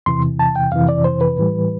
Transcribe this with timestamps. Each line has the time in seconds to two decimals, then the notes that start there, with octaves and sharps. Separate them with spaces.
0.06 E2 C3 E3 C6
0.39 A5
0.56 G5
0.72 F2 C3 E3 F5
0.89 D5
1.04 C5
1.21 B4
1.38 A2 E3 G3